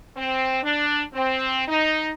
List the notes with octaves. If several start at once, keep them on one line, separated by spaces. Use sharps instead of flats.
C4
D4
C4
D#4